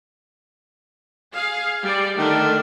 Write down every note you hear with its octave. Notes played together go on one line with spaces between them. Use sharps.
G#4 F5
G3 D5
D3 D#3 A3 D4